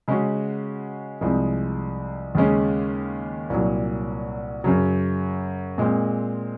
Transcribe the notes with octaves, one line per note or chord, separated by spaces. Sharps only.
C#3 G#3 C#4 F#4
C2 C3 F3 G#3
D#2 C#3 G#3 C#4
C2 A#2 F#3
F#2 C#3 F#3
A#2 G#3 C4